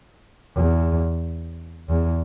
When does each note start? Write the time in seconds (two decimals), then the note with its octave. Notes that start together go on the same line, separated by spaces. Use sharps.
0.57 E2
1.89 E2